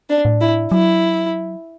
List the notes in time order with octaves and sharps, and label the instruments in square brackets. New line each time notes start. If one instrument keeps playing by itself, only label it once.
[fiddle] D4
[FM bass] A2
[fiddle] E4
[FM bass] F#3 [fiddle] E4